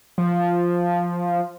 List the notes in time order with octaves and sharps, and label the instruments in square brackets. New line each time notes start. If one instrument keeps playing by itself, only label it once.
[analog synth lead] F3